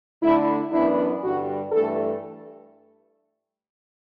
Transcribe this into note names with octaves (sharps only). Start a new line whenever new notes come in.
D3 A3 D4 E4
F#2 E3 B3 D4 E4
G2 D3 G3 F#4
G2 E3 A3 A4